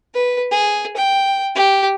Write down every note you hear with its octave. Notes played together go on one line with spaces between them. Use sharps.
B4
G#4
G5
G4